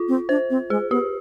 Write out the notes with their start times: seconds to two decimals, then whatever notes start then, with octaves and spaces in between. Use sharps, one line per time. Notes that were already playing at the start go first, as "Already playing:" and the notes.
Already playing: F4
0.08 C4
0.29 D4 C5
0.50 C4
0.70 G#3 G#4
0.91 B3 G4